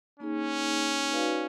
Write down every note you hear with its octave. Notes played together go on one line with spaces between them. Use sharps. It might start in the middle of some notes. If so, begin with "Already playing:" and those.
A#3 C#4 D#4 G#4
D#4 F#4 B4 D5 F5